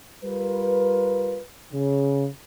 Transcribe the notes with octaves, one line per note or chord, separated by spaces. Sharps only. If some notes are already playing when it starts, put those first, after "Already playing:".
G3 F4 A#4 B4
C#3